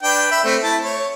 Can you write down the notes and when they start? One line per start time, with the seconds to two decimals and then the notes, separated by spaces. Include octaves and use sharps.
0.03 D4 B4 G5
0.31 E5 B5
0.44 A3 C4
0.63 E4 A5
0.83 C#5